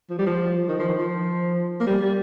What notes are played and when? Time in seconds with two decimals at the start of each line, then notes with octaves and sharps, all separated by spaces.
0.10 F3
0.19 G3
0.26 F3
0.69 D#3
0.79 F3
0.88 D#3
0.98 F3
1.80 A#3
1.87 G3
2.02 G3